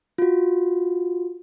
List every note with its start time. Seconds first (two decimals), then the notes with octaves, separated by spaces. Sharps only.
0.18 F4 F#4